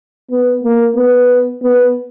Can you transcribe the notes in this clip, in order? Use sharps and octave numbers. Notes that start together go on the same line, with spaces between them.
B3
A#3
B3
B3